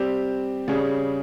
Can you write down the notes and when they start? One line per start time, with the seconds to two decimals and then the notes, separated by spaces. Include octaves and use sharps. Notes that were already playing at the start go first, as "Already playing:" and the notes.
Already playing: G3 C4 G4
0.68 C#3 G3 C#4 G#4